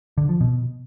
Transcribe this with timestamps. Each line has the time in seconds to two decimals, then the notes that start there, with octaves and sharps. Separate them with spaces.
0.18 D3
0.29 F3
0.41 B2